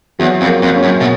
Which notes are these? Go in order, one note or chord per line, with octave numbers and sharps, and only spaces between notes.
E2 F#3
F2
A#3
F2
C#4
F#2
B2